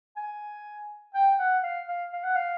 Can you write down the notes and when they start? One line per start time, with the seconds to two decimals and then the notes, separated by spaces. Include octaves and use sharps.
0.17 G#5
1.15 G5
1.39 F#5
1.63 F5
1.88 F5
2.13 F5
2.24 F#5
2.36 F5